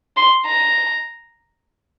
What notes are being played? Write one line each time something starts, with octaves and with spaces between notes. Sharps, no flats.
C6
A#5